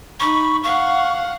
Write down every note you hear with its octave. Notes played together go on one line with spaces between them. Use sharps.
D#4 B5 C#6
F5 F#5 C#6